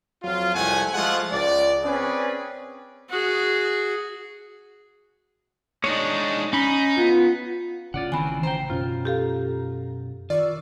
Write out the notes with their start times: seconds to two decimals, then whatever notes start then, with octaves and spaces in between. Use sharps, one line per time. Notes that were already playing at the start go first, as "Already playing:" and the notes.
0.23 F2 F#3 F4
0.55 C2 F2 A3 F#5 G#5
0.94 F3 G#3 A3 F4 F#5
1.32 C#2 D5
1.84 C4 C#4 G#4 B4 D5
3.09 F#4 G#4
5.84 G#3 D4 D#4 C#5
6.53 C#4 D#4 B5
6.98 B3 F4
7.94 A1 C#3 F4 D5 F#5
8.12 D#3 E3 C4 G#5 B5
8.43 C5 G5 A#5
8.70 F#2 B2 C#4 F4
9.05 G4 A4 F5
10.30 D#3 F4 D5 C#6 E6